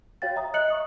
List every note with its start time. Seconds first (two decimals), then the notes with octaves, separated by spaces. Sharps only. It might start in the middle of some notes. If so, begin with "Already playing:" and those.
0.22 F#4 C#5 F5 G5 A6
0.36 E5 A#5 D#6
0.54 D#5 F#6 C#7 F#7
0.68 C#6 D#6 C#7